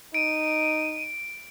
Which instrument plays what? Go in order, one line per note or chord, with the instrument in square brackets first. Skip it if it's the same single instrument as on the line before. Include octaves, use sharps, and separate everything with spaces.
[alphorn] D#4 [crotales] D7 [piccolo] D#7